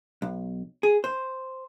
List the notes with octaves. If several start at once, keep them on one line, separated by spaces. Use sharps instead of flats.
B1
G#4
C5